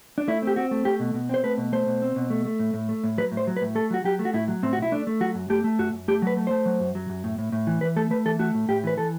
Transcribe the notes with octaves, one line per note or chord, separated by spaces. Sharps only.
D4
A3 E4
C4 G4
C4 F#4
A3
A3 G4
B2
B2
C4 C5
A3 B4
B2
A3 C5
B2
C4
B2
A3
A3
A2
A2
A3
A2
F#3 B4
A2
C5
F#3
B4
A2
A3 A4
F#3 F#4
F#3 G4
A3
F#4
A2 E4
F#3
A2 C4
B1 F#4
E4
A3 D4
A3
F#3 F#4
F#2
A3 G4
A3
F#2 F#4
F#2
A3 G4
F#3 B4
A3
A3 C5
F#3
F#2
F#3
F#2
A2
A2
A2
E3
E3 B4
A3 A4
A3 B4
E3 A4
A3 F#4
A2
A2 G4
E3 B4
E3 A4